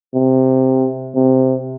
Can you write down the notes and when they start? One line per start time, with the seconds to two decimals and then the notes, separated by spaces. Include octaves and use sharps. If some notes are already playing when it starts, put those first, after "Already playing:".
0.14 C3
1.15 C3